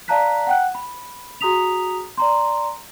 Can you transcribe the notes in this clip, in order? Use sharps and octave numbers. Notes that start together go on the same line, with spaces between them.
D5 F5 A5 A#5 F#6 B6
F#5 G5 F#6
B5
F#4 G#4 A#5 D#6 B6 F7
D5 A#5 C6